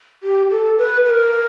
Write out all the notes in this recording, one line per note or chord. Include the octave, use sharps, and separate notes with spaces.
G4
A4
B4
B4
A#4